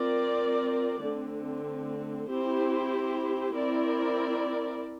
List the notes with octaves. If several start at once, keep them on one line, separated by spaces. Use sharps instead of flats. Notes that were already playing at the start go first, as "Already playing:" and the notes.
Already playing: C4 F4 A#4 D5
D3 A3 C4
C4 E4 G4 C5
C4 E4 A#4 D5